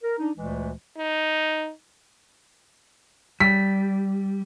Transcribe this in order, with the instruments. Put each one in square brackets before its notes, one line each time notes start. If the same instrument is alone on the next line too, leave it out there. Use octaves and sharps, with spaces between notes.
[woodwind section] A#4
D4 D#4
D2 A#2 E3 G#3 A3
[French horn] D#4
[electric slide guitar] G3 [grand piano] B6